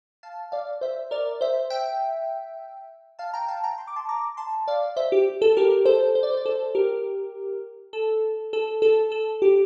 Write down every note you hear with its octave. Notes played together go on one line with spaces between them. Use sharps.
F5 A5
D5 F5
C5 E5
A#4 D5
C5 E5
E5 G5
F5 A5
G5 A#5
F5 A5
G5 A#5
C6
D6
A5 C6
A#5 D6
A5 C6
D5 F5
C5 E5
G4
A4
G4 A#4
A4 C5
C5
D5
C5
D5
A4 C5
G4 A#4
A4
A4
A4
A4
G4